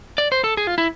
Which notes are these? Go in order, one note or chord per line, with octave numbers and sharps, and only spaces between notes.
D5
C5
A4
G#4
F4
E4